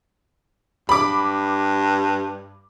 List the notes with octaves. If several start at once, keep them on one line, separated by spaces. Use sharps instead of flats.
G2 B5 D6